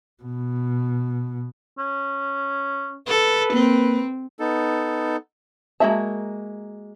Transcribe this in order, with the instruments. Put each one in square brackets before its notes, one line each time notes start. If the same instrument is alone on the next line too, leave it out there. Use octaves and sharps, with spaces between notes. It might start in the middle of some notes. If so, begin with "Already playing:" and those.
[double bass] B2
[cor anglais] C#4
[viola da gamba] A4 [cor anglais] B4
[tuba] A#3 [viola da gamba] C4
[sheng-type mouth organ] B3 D#4 A4
[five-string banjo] G#3 A#3 F#4 E5 A5